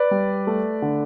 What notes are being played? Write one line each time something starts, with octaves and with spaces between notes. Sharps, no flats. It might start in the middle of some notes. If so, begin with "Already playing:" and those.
Already playing: B4 D5
G3
A3
D3